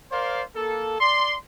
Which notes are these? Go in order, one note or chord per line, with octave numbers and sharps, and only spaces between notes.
A#4 C5 D5 F5 C6
A#3 A4
D5 C6